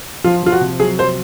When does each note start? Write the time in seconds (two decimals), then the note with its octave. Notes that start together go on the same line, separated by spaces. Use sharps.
0.24 F3 F4
0.43 F3 F4
0.52 F#4
0.61 C3
0.80 F#3 G#4
0.99 F#3 C5